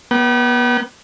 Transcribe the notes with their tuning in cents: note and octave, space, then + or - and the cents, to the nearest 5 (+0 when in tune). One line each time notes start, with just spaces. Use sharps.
B3 -35 F#5 +45